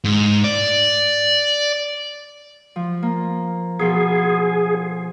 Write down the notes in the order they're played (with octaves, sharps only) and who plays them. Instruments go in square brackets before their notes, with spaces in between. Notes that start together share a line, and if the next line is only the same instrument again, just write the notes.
[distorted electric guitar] G#2
D5
[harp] F3
A#3
[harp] B2 F3 [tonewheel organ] G#4